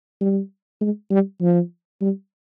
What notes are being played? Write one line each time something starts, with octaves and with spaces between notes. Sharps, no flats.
G3
G#3
G3
F3
G3